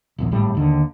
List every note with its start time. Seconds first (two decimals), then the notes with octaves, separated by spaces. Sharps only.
0.18 D#1 A#1 E2
0.31 G#1 A2 G3
0.55 D#2 D3